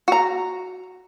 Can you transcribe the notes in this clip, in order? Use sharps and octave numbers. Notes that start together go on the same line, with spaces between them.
F#4 A#5